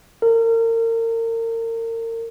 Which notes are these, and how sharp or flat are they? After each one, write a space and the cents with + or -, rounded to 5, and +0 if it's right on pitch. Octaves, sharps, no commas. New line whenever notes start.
A#4 -35